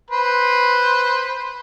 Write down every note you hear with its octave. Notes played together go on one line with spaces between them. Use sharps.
B4 C5